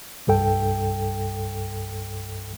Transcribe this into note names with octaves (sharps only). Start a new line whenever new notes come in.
C2 G2 A4 G5